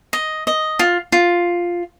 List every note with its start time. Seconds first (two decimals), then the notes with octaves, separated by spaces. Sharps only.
0.13 D#5
0.47 D#5
0.79 F4
1.12 F4